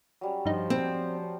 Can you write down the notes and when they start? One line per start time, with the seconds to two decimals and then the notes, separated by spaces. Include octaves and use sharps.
0.21 F#3 G3 C#4
0.45 G2 F3 D#4
0.70 C4